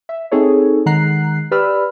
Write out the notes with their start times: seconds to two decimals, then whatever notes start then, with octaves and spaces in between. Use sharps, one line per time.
0.09 E5
0.32 C4 D#4 G#4 A4 C#5
0.86 D#3 G#3 F#5 A#5 F#6 C7
1.51 G4 B4 D5 B5 E6 F6